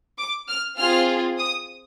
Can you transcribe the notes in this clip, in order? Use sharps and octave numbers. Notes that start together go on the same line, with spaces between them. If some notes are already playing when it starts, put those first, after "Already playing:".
D6
F6
C4 F4 G#4 F6
D#6